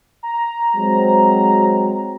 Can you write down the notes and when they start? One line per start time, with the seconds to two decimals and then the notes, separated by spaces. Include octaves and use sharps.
0.23 A#5
0.76 F#3 G#3 C4